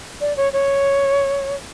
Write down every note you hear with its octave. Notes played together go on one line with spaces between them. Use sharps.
D5
C#5
C#5